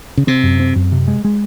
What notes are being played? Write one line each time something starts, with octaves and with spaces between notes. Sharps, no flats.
C#3
C3 C4
F#2
C4
F#2
C3
G#3
G#3